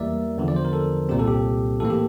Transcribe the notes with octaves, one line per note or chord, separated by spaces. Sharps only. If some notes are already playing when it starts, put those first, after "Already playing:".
Already playing: E2 E3 G3 A#3 A#4 D5 E5
E2 D3 F3
D5
C5
A#4
A4
C2 A#2 G3 C4 G4
A4
G4
A2 E3 A#3 A4
G4